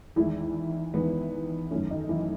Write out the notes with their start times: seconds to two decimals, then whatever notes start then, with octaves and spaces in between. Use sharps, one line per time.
0.16 E2 D#3 E3 G#3 E4
0.94 E2 D#3 G#3 B3
1.71 F#2 D#3 A3 C#4
1.91 D#3 D#4
2.09 E3 E4